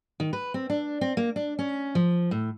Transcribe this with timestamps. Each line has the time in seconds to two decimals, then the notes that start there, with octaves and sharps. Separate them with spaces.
0.20 D#3
0.33 B4
0.54 C4
0.70 D4
1.01 C4
1.17 A#3
1.36 D4
1.59 C#4
1.95 F3
2.31 A2